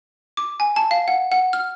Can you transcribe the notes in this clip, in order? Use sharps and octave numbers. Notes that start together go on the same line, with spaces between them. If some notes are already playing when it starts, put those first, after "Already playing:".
D6
G#5
A5
F5
F#5
F#5
F6